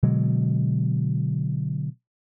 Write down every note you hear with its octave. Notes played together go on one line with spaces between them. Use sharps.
B2 D3 F#3 G#3